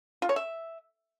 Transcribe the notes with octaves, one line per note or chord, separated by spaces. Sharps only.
F4
C#5
E5